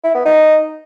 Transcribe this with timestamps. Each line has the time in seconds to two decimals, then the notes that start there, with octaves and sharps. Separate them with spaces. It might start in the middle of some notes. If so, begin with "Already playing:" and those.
0.04 E4
0.15 B3
0.25 D#4